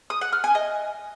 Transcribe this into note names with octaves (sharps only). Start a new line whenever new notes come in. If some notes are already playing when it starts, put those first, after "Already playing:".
D#6
F#5
F6
G#5
D#5